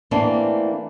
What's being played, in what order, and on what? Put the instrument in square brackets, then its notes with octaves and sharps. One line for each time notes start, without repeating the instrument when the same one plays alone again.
[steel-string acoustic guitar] E3 A3 A#3 C4 D4